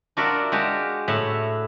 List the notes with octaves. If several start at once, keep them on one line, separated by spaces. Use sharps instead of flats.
D4 F4 F#4 A#4 D5 E5
G#3 F#4 G4 F5 A5
A2 E5 F#5